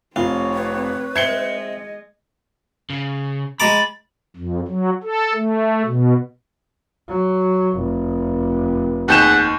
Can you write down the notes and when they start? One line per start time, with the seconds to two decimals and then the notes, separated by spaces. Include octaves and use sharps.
0.16 F1 C4 F4 C#5
0.54 B4
1.16 G#3 C4 D#5 E5 G#6 C#7 G7
2.90 C#3
3.60 G#3 A#5 B5 D6 A6
4.36 F2
4.68 F#3
5.03 A4
5.34 A3
5.86 B2
7.08 F#3
7.76 F1
9.08 D#2 G#4 B4 F#5 G6 E7